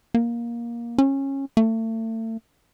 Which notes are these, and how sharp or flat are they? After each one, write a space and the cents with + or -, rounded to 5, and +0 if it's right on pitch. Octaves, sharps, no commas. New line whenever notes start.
A#3 +15
C#4 -20
A3 +35